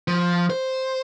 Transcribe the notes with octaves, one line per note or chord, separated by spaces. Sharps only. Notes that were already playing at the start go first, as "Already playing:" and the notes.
F3
C5